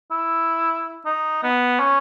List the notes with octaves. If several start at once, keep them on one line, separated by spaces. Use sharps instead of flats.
E4
D#4
B3
C#4